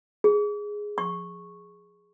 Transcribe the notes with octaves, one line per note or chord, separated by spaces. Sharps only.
G#4
C#6